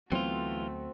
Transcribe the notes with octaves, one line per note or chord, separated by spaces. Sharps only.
D2 E3 F#3 A3 B3 C4 F4 F#4